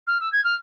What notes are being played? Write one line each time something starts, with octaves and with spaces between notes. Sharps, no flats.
F6
E6
G#6
F6